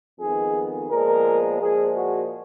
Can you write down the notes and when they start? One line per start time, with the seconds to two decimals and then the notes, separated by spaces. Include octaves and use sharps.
0.20 F2 D#3 G#3 B3 G#4
0.90 A#2 F3 G#3 B3 A#4
1.61 A#2 F3 G#3 G#4
1.96 F#4